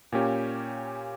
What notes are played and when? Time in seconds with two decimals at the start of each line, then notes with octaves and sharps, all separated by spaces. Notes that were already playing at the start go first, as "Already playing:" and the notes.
0.12 A#2 A#3 C#4 G4 C#5